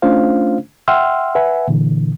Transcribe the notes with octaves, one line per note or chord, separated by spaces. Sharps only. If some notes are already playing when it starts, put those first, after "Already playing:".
A3 C#4 D4 F4 C5 F5
E5 F#5 G5 C6 E6 F6
B4 E5 F#5 G#5
A#2 D3 E3